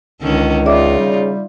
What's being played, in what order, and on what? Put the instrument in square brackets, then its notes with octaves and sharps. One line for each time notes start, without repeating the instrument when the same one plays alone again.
[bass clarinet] C#2 [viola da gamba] D3 D#3 C#4
[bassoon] C#3 [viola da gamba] D#4 F4 [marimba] D5 E5 D6
[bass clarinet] G3